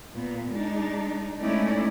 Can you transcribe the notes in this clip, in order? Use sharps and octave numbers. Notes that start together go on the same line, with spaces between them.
A#2 B3
G#3 D4 D#4
G#3 A3 C#4 D#4 E4 D5